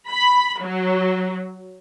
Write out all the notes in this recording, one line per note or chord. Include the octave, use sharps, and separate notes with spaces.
B5
F#3